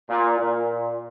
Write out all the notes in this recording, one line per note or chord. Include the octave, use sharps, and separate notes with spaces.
A#2
A#2